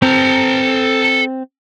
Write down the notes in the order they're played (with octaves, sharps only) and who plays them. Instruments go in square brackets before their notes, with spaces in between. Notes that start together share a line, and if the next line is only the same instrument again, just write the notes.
[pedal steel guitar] C4 [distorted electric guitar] A4 A#5